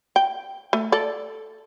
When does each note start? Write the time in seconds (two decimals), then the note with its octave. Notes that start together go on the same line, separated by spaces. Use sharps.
0.16 G5
0.73 A3
0.92 A4 D5